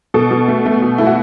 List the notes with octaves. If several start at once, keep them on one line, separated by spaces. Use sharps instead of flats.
B2 A4
B2
A3
A3
B2
A3 E4
F#4